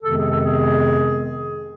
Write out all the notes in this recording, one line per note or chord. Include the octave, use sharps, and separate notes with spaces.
F2 C3 D#3 G#3 B3 A4
G#4
A4
G#4